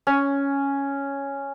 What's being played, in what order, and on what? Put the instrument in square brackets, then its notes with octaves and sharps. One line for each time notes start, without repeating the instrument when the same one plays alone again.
[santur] C#4